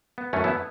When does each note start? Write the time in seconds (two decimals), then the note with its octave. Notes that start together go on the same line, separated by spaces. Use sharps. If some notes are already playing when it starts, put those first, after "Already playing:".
0.18 B3
0.33 F#2 E3 A3 C#4
0.44 B3 E4